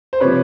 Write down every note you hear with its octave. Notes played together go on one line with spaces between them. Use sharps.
C5
C3 F3 B4 C#5